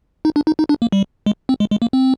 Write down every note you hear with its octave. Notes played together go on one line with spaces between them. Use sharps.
D#4
D4
D#4
D#4
D4
A#3
G3
G#3
C4
G#3
G#3
A#3
C4